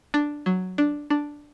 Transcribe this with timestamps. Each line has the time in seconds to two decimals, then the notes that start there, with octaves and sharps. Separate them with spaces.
0.14 D4
0.46 F#3
0.78 D4
1.10 D4